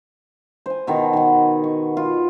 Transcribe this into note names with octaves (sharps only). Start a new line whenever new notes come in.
C5 G#5
B2 D#3 B3
D#3 F#5
C#6
F4